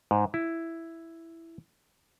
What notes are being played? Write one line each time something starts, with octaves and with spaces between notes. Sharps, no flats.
G#2
E4